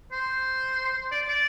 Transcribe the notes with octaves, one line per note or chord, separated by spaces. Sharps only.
C5
D5
D5